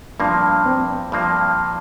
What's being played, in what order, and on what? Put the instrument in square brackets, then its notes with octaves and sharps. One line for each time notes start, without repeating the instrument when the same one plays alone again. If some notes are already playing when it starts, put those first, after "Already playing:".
[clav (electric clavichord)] G2 F3 A#3 [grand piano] D4
[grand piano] C4
[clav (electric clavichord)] G2 F3 A#3